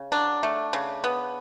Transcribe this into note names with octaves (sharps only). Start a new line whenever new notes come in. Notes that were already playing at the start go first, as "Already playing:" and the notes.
Already playing: C#3
F#3 D4
A3
C#3
B3